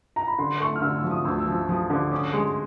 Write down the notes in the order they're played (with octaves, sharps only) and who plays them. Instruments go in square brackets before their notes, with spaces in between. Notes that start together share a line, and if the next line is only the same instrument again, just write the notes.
[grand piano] A#5
B5
[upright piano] D3 [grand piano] C6
[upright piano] A3 [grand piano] C#6
[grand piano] F6
[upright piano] D3 [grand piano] E6
[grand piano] E6
[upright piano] F3
[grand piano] D#6
[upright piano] D2 [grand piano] E6
[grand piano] E6
[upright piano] F3
[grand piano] E6
[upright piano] F3 [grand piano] D#6
[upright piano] D3 [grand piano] D6
[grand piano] D6
[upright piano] C#4 [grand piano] D#6
[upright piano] G#3 [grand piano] C6